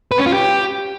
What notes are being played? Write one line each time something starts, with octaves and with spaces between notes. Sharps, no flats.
B4
C#4
F4
G4